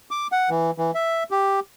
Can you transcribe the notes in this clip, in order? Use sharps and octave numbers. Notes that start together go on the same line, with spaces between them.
D6
F#5
E3
E3
E5
G4